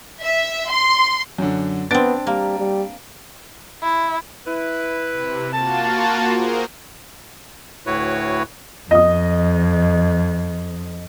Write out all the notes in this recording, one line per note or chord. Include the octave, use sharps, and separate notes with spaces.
E5
C6
F#2 D3
B3 C4 D4 A6 D7
G3 A#3
G3
E4
E4 B4
C3
A#3 F4 F#4 A5
G#4 A#4 C5
D2 A2 E4 F#4 B4 C#5
F2 D#5 D#6